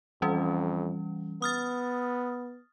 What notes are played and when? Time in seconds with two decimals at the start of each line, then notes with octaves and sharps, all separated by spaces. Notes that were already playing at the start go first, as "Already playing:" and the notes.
0.22 F2 E3 G3 C#4
1.42 B3 D#6 F6 A6